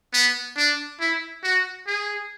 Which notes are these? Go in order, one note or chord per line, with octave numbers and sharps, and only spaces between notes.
B3
D4
E4
F#4
G#4